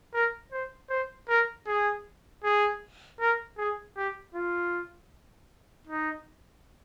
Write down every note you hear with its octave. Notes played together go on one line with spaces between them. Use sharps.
A#4
C5
C5
A#4
G#4
G#4
A#4
G#4
G4
F4
D#4